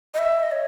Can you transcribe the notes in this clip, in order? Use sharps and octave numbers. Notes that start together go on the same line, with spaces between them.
D#5
E5
D#5
C#5